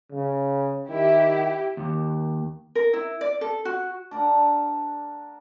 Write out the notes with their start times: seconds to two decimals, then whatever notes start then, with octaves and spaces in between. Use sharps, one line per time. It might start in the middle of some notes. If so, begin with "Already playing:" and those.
0.12 C#3
0.89 D#3 E4 G4
1.77 D#2
2.75 A#4
2.93 E4
3.21 D5
3.41 A4
3.65 F#4
4.11 D4 A#4 F#5